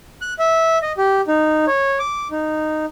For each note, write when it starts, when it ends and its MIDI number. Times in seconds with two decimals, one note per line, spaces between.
0.21 0.34 90
0.39 0.79 76
0.82 0.92 75
0.98 1.21 67
1.28 1.65 63
1.67 1.99 73
1.99 2.28 86
2.31 2.86 63